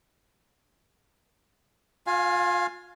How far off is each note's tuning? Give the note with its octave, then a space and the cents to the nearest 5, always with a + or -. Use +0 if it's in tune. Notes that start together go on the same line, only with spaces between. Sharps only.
F4 +35 F5 +0 G#5 +5